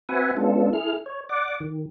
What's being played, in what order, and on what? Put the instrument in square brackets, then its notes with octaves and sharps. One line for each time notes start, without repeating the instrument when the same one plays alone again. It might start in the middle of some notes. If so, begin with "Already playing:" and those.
[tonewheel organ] C4 F#4 B4 E5 F#5 G#5
G#3 B3 C#4 D4 F4 A4
E4 G#4 A4 F6
C#5
D5 F#5 D6
D#3